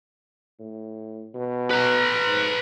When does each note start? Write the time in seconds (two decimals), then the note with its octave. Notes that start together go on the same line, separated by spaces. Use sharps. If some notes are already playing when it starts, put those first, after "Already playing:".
0.59 A2
1.35 B2
1.71 B4 A#5
2.26 G#2